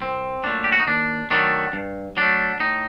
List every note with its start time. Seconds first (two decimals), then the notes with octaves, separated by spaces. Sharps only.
0.01 C2 C4
0.44 A#2 F#3 A3 D4
0.64 G4
0.72 F#4
0.80 D#4
0.87 D#2 D4
1.31 D#3 F#3 A3 D4
1.73 G2
2.17 F#3 A3 D4
2.60 A2 D#4